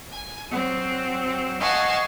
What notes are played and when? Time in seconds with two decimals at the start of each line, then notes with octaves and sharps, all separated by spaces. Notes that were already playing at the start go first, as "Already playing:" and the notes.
0.11 G#5
0.50 F#3 C4
1.59 D#5 F5 F#5 G#5 A5 C#6